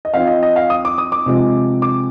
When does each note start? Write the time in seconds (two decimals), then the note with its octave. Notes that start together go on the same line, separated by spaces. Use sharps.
0.05 D#5
0.14 F3 C4 D#4 F5
0.27 D#5
0.43 D#5
0.56 F5
0.70 D#6
0.85 D6
0.98 D#6
1.12 D6
1.26 C3 F3 G#3 C4
1.82 D6